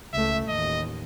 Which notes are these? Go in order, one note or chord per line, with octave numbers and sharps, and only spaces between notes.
C#2 A3 E5
A1 D#2 D#5